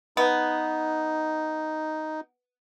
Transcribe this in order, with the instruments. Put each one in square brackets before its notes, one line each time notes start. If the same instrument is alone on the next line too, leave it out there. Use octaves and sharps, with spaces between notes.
[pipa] B3 [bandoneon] D#4